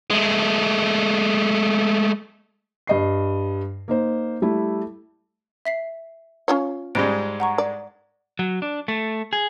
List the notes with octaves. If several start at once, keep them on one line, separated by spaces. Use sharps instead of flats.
G#3 A3
G2 D#5 C7
A#3 D#4 C5
G3 A3 E4
E5 B6 C7
C#4 F4 C#5
G#2 G3 G#3 D7
F#5 A#5 C#6
D5 D6
F#3
D4
A3
G#4